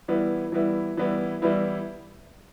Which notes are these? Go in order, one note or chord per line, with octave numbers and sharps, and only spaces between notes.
E3 G3 B3 E4
E3 G3 B3 E4
E3 G3 B3 E4
E3 G3 B3 E4